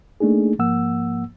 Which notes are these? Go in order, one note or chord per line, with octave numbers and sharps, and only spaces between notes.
A3 A#3 D4 D#4 G#4
G#2 F3 A#3 F#5 E6